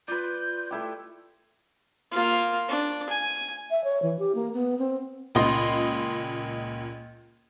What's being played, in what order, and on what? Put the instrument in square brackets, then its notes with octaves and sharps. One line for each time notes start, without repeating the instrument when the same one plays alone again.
[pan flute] F4 [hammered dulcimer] B4 D5 [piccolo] G6
[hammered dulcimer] A3 E4 G4
[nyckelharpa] A#3 F4
D4
G#5
[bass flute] E5
C#5
E3
G4
A#3
B3
C4
[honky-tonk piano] C#2 A#2 D#5 C6